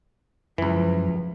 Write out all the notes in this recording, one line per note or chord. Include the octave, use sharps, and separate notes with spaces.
C#2 F#2 E3 F3